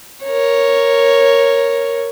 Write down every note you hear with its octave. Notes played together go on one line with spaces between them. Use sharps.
A#4 C#5